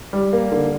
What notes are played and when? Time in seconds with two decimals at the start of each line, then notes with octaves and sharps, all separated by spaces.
0.13 G3
0.33 A#3
0.52 D3